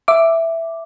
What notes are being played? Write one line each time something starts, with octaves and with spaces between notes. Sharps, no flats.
E5 D6